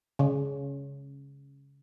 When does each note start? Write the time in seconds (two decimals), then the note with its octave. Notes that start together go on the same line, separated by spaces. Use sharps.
0.19 C#3